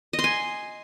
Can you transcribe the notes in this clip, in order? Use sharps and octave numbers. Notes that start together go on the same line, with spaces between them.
D#5
C6
G#5